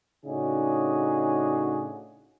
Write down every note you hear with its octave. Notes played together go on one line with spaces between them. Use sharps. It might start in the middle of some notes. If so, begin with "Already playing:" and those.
A2 C#3 D4 D#4 F#4 G#4